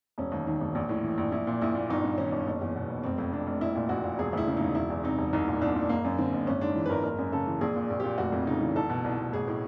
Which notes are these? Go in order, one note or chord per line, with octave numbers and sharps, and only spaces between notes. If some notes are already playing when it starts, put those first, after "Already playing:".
E1 C#4
D#2
D#3
E1
A#1
A2
E3
A#1
A#1 E4
A#2
A#1 E4
A#2
G1 D#4
G2
D#3 C#4
G1
F#1
E2
B2
F#1
F1 C4
F2
C3 D4
F1
A#1 E4
A#2
A#1 F#4
A#2
E1 G#4
D2 E4
C#3
E1 D#4
E1 E4
E2
C3 D#4
E1
C2 D#4
A#2
C2 D4
A#2
F#1 A#3
F#2
D3 C4
F#1
G#1 C#4
G#2 D4
E3
B4
G#1 A#4
F#1 A#4
F#2
C#3 A4
E3
A#1 G#4
A#2
A#1
A#2 G4
F1 F#4
F2
C#3 D#4
E3
C2 A4
B2
C2
B2
A1 G#4
A2